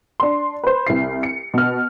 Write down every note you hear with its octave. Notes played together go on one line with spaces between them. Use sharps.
D4 C6
B4 C5
C2 E4 C7
C#7
B2 F6